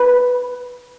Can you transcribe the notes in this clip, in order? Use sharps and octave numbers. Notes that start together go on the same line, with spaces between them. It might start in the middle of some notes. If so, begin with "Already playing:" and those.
Already playing: B4